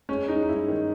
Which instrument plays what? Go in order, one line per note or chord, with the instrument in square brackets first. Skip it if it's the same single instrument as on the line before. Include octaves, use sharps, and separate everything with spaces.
[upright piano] G#3 C#4
G#3 D#4
D#4
G#3 E4
D#3